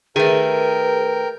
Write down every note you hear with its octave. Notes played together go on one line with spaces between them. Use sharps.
D#3 A3 G#4 A#4 B4 G5